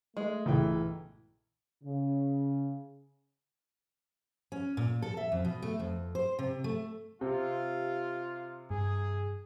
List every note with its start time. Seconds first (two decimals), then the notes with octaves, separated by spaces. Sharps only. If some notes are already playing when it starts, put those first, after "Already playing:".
0.17 G#3 A3
0.46 B1 G2 A#2 C#3 E3 G5
1.84 C#3
4.52 C#4
4.77 A#2
5.02 A4
5.17 E5
5.32 F2
5.45 B2
5.62 A3
5.79 F2
6.15 C5
6.39 C3
6.64 A3
7.21 C3 F4 G4
8.70 G2 G#4